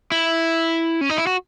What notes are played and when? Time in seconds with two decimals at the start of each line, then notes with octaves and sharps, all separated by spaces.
0.12 E4
1.01 C#4
1.09 D#4
1.18 E4
1.27 F#4